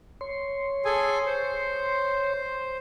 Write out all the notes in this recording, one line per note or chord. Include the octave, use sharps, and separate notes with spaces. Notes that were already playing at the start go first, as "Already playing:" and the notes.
C#5 C6
G#4 A4 G#5
C5